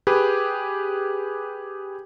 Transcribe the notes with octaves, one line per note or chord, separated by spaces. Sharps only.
G4 G#4 B4